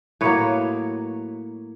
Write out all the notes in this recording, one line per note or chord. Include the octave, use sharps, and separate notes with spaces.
A2 F#3 A#3 B4 C#5